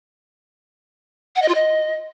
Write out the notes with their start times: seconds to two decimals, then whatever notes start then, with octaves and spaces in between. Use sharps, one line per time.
1.36 F#5
1.42 D#5
1.48 F4
1.54 D#5